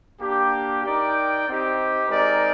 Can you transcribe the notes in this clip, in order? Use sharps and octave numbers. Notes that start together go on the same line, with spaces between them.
A#3 D4 G4
D#4 A#4 D5 G5
C4 D#4 G4
G#3 C4 D#4 A#4 D5